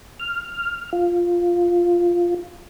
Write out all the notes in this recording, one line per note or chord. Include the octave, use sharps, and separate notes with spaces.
F6
F4